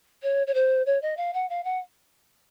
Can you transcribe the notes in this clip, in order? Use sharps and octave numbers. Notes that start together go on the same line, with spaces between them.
C#5
C#5
C5
C#5
D#5
F5
F#5
F5
F#5